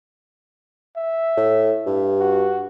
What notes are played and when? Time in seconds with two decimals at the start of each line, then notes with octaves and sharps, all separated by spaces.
0.96 E5
1.37 A2
1.86 G2
2.20 F#4